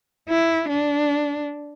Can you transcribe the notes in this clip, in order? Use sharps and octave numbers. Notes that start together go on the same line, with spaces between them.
E4
D4